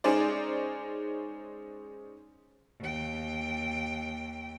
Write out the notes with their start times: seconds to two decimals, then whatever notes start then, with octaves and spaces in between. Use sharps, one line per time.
0.04 G#3 C#4 D#4 G#4 C5 D5
2.80 D#2 G5